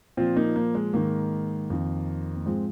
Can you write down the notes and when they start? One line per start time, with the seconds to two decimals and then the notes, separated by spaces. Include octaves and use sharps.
0.17 A#2 F3 C4 F4
0.36 A#3 D#4
0.56 A#3
0.75 G#3
0.94 G#2 D#3 A#3
1.70 F2 D#3
2.37 A#3
2.46 G#2 F3 G#3 C4